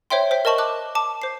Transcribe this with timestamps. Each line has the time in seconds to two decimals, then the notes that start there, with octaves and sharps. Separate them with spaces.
0.10 C5 C#5 E5 G5 C6
0.31 C5 G5 B6
0.45 A#4 D#5 A5 C#6 F#7
0.58 A5 D6 F#6
0.95 A5 D6
1.22 C5 C7